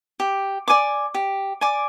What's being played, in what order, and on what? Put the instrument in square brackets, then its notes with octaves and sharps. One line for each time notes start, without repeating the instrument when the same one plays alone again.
[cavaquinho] G4
D5 G#5 D6
G4
D5 G#5 D6